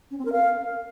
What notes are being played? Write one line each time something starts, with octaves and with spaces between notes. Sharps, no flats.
C#4
C4
A#4
F5